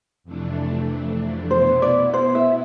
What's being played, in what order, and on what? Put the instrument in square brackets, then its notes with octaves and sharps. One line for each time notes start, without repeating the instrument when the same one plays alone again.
[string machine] F2 C3 E3 A3 D4
[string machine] B2 B3 E4 [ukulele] C5
[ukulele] D5
C5
E5